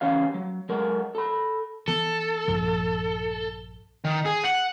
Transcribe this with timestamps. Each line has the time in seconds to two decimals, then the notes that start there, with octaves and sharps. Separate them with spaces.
0.01 E3 C#4 G4 F5
0.34 F#3
0.69 F#3 G#3 A#4
1.15 A4 B5
1.88 E3 B3 A4
2.48 A#1 G2 F3
4.05 D#3
4.26 G#4
4.44 F#5